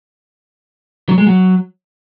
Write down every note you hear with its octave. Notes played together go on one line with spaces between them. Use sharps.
F#3
G#3
F#3